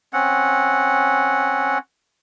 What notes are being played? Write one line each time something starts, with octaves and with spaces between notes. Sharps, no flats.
C4 C#4 F#5